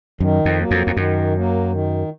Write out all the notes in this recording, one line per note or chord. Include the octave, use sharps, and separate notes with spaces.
F#2 D#3
F2
F#3 A#3
F2
F2
F#2 D#3
F#3 A#3
D#3